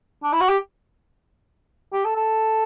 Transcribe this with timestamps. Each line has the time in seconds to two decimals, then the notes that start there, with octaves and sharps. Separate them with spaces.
0.24 D4
0.33 E4
0.41 F#4
0.49 G4
1.93 G4
2.05 A4
2.16 A4